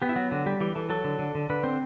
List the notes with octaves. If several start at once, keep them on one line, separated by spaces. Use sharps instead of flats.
B3 G4
E4
F#3 F#4
D3 F#4
G3 G4
E3 G4
E3 A4
F#3 A4
D3
D3
D3
D3 B4
C4 C5